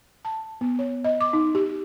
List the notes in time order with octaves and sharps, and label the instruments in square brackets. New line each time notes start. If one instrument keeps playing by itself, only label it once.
[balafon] A5
B3
C#5
D#5
D6
D#4
G4